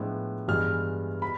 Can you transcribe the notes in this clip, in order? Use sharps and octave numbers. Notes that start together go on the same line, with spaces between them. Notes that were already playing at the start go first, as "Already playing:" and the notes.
Already playing: A2 F3 G#3 B3 D4
G2 E3 G#3 B3 F6
B5